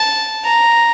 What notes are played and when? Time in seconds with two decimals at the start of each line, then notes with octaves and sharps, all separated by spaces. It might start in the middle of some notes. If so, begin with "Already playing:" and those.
Already playing: A5
0.45 A#5